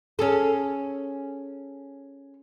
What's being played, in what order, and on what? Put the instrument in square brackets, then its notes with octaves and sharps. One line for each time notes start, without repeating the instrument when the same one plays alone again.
[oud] C#4 G#4 A4